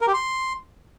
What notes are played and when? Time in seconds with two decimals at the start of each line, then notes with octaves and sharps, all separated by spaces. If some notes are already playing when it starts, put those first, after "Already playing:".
0.01 A#4
0.07 G4
0.14 C6